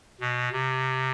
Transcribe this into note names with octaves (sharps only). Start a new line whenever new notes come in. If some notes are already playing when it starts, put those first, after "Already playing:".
B2
C3